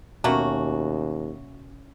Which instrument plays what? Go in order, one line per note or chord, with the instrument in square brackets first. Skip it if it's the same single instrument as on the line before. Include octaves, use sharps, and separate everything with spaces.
[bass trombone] D#2 [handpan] B2 C#4 [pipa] A3 A#3 F#4